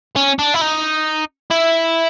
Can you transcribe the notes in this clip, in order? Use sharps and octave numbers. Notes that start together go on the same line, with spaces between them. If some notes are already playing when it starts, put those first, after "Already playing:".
C#4
D4
E4
D#4
E4